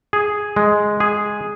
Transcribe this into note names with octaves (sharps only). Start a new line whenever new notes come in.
G#4
G#3
G#4